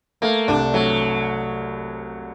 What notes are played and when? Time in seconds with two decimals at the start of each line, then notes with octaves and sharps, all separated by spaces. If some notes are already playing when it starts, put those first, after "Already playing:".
0.22 A3 A#3
0.48 C2 D4
0.73 F#3 A3